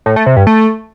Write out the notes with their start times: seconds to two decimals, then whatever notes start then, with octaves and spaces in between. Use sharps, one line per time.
0.06 A2
0.16 A3
0.26 C3
0.37 G2
0.47 A3